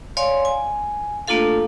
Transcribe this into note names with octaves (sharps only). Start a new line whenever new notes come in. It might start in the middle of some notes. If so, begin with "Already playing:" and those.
C#5 D5 F5 G#5 C6
G#5
A3 A#3 D4 F4 A4 F5